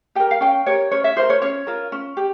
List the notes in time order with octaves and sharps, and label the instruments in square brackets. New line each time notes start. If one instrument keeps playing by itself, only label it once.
[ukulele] G4 A#4 G5
F5
C#4 G5
G4 A#4 C#5
C#4 C#5
E5
F4 A#4 C5
C#5
C#4 C#5
F4 A#4
C#4
G4